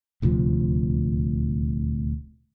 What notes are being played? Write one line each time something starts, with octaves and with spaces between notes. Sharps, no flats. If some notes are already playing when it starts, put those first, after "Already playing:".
D#1 D2 C3 F3